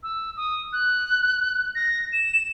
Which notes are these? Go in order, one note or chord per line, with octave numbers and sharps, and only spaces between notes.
E6
D#6
F#6
A#6
E7